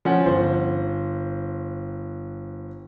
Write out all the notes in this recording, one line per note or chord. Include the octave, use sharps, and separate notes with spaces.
F3 C#4 F#5
G1 C5